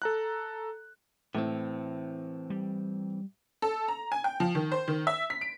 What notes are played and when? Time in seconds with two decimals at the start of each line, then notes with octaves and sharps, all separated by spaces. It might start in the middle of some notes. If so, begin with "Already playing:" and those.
0.02 A4 A#5 F#6
1.35 A2 E3 C4
2.50 G3
3.62 A4
3.88 A#5
4.12 G#5
4.24 G5
4.40 F3
4.55 D#3
4.72 C5
4.88 D#3
5.07 E5
5.30 B6
5.41 D7